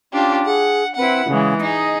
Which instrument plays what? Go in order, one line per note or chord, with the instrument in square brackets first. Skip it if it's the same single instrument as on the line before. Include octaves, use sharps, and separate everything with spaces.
[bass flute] C#4 [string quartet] D4 F4 G4
[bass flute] G#4 [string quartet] F#5
[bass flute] C4 [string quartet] E4 B4 F#5
[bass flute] C#3 [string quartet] E3 G#3
[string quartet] D#4 G#4 [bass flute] D#5